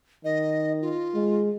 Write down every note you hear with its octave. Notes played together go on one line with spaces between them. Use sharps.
D#3 D#5
F4
G#3